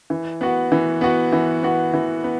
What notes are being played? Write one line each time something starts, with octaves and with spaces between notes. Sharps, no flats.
E3
B3 F#4
E3
B3 F#4
E3
B3 F#4
E3
B3